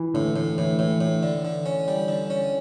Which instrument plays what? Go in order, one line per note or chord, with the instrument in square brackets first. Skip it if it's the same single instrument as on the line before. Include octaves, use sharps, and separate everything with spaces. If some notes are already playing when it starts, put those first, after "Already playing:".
Already playing: [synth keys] E3
[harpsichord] A2 [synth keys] D3
[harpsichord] A2 [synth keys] D3
[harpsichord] A2 [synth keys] E3
[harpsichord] A2
A2
D3
D3
C#4
G3
D3
C#4